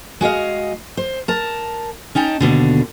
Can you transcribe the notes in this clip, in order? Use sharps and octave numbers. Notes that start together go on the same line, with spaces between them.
G#3 F#4 D#5 F5
C5
A#4 A5
C#4 D#4 G5 A5
D#2 B2 D3